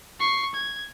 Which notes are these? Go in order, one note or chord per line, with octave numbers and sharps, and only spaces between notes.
C#6 C7
G#6